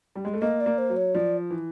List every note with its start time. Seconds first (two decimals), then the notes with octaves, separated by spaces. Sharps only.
0.16 G3
0.25 G#3
0.34 A3
0.41 A#3 D#5
0.61 D5
0.66 A#3
0.78 C5
0.90 F#3
0.96 C#5
1.15 F3 D5
1.50 E3